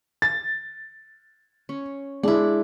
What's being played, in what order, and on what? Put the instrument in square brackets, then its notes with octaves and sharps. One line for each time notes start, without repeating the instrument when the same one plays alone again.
[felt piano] A6
[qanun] C#4
[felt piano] G#3 [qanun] D4 E4